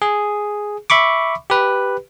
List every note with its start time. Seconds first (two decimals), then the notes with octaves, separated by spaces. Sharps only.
0.02 G#4
0.90 E5 B5 C#6 D6
1.50 G4 B4